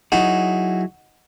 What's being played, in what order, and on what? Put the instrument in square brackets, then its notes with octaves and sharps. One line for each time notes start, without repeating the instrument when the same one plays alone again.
[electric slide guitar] F#3 E4 G#4 [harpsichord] D#4 F#4